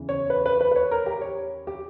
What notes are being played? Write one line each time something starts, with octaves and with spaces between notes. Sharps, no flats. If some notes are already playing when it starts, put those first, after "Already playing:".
Already playing: E2 C#3 E3
C#5
B4
B4
B4
B4
C#5
A#4
G4
C#5
G4